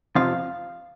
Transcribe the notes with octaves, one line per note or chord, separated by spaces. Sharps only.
F2 C3 F3 F5